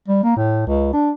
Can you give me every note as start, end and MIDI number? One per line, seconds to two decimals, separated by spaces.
0.08 0.19 55
0.23 0.35 58
0.37 0.65 45
0.67 0.91 37
0.93 1.10 62